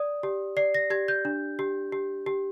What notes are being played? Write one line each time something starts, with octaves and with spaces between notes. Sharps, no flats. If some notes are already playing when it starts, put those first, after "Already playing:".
Already playing: D5 D#6
G4
D5 C7
A#6
G4 G#6
G6
D4
G4
G4
G4